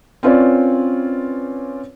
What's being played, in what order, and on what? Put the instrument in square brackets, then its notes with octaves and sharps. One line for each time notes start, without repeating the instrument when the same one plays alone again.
[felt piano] C4 C#4 F4 B4 C#5 D5